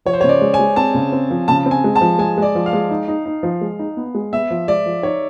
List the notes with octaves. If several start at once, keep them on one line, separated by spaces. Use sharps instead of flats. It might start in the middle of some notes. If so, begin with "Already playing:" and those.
F3 C#5
C5
C#5
C#3
D5
G#3
G#5
G#3
C4 A5
C#3
C4
F3
C#3 A5
C4
G#5
G#3
A5
F3
G#3 G#5
G#3 D5
F3
F5
G#3
D#4
D#4
D#4
F3
G#3
D#4
B3
G#3
B3 E5
F3
G#3 D5
F3
D#4 C#5